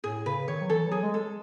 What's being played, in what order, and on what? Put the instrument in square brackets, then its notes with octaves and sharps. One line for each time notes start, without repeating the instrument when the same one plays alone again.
[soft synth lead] A2 [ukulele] G#4
[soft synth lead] C#3 [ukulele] B4
[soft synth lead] D#3 [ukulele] C#5
[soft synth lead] F#3
[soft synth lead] E3 [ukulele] A4
[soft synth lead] F#3 [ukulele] G#4
[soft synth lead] G#3
[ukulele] A4